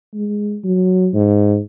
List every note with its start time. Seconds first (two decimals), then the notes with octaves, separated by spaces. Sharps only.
0.14 G#3
0.64 F#3
1.14 G#2